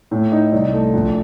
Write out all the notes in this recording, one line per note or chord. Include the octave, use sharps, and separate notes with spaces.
A2
D#4
C2
A3
A#1